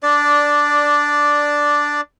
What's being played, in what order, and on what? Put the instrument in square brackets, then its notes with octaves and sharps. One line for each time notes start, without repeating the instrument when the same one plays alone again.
[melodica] D4 D5